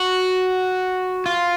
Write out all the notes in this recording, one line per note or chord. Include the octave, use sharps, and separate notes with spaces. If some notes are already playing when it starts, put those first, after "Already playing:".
Already playing: F#4
F4